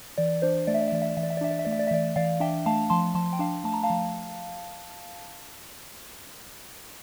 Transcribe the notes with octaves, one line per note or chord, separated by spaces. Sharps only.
E3 D5
D4 C5
A3 D5
E5
D5
E5
E3 D5
E5
D5
E3 E5
D5
E5
D5
D4 E5
D5
E5
A3 D5
E5
D5
E5
E3 D5
E3 D5 F5
D4 E5 G5
A3 F5 A5
F3 A5 C6
F3 A5 C6
G5
D4 F5 A5
A3 A5
A#5
F5 A5
F3